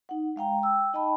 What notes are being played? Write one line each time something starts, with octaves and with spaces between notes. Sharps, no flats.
D#4 F#5
G#3 F5 G5 A#5
G5 E6
D#4 D#5 G5 A5 B5